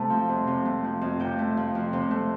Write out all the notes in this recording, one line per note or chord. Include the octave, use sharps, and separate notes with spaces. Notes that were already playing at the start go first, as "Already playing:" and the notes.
Already playing: C3 A3 A5
F3
F2
C3
A3
F3
F2
C3 G5
A3
F3
F2
C3
A3